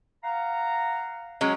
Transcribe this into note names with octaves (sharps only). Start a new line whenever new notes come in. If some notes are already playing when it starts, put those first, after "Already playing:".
F5 F#5 A#5
F#3 G#3 C#4